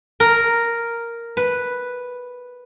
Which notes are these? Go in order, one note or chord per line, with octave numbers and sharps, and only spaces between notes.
A#4
B4